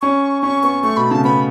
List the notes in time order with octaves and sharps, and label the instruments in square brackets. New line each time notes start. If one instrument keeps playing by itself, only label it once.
[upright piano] C#4 [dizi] C#6
[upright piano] C#4 [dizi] C#6
[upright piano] B3 [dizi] C#6
[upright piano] A3 [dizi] C#6
[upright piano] B2 [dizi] B5
[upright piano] C#3 [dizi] A5
[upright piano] B3 [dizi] B5